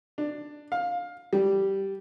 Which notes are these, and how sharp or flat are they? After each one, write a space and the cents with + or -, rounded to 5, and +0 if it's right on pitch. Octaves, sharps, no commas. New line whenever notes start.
D4 +10
F5 +15
G3 -10